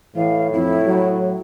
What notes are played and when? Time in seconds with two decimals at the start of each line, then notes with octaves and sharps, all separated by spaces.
0.16 A2 E3 F5
0.53 F2 E4
0.86 F#3